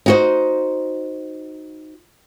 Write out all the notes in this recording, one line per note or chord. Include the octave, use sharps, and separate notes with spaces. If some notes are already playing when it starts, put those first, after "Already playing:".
D#4 F#4 C5